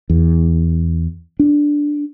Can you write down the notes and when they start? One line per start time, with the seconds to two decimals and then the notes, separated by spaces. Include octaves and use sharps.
0.10 E2
1.39 D4